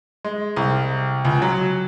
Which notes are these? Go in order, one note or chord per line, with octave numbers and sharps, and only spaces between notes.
G#3
C2
C#2
F#3